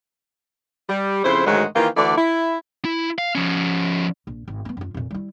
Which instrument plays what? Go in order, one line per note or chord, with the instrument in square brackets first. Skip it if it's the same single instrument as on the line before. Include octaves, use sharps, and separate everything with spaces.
[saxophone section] G3
F2 C#3 E4 C5
D2 G#2 D#3 F#3 G#3 F#4
D#3 E3 A#3 F4 G4
D2 D3 E3 D5
E4
[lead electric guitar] E4
F5
F3 C#4
[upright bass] A#1
G#1
B3 C4
F#2 F4
F2 A#2
G3 E4